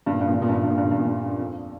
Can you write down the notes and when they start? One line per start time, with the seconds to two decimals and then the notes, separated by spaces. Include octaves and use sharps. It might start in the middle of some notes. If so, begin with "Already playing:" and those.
0.06 G2
0.12 A#2
0.21 G2
0.27 A#2
0.34 G2
0.42 A#2
0.49 G2
0.56 A#2
0.63 G2
0.70 A#2
0.78 G2
0.84 A#2
0.91 G2
0.99 A#2
1.06 G2
1.38 F2